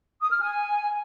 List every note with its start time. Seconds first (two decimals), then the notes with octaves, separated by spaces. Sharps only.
0.22 D#6
0.31 F6
0.41 G#5